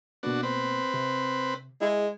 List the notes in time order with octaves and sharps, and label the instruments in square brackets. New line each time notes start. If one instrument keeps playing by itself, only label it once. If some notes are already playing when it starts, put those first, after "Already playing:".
[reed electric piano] B2 A#3 B3 [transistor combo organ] D4 F#4
[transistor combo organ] C4 B4
[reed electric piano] C3
[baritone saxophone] G#3 [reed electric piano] E4 G#4